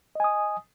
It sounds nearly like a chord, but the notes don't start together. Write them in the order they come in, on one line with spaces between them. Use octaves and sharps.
D#5 G#5 D#6